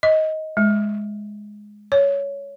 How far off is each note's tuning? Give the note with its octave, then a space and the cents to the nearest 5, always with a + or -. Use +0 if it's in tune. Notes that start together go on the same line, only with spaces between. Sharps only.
D#5 +15
G#3 +0
C#5 +15